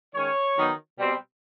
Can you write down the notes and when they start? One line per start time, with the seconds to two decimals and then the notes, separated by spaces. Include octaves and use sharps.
0.14 D#3 G#3 C#4 C#5
0.56 D#3 F#3 B3 D#4
0.98 B2 G3 C4